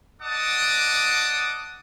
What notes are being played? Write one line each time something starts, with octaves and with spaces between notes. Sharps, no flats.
D5 D#5 F#5 A5 D6 D#6